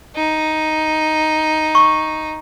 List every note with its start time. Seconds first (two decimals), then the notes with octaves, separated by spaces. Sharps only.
0.16 D#4
1.75 C#6